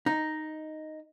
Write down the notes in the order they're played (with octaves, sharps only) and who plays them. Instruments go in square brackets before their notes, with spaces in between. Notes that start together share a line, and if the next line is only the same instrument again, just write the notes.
[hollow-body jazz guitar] D#4